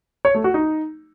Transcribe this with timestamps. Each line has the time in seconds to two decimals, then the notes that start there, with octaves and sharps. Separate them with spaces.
0.25 C#5
0.34 A3
0.44 F#4
0.54 D#4